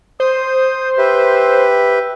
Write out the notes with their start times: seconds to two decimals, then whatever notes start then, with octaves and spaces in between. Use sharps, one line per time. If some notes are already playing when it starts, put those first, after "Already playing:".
0.20 C5 D#6
0.98 G4 B4 E5